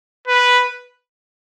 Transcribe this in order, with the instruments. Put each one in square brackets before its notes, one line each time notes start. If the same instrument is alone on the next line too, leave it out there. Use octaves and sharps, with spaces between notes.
[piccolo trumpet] B4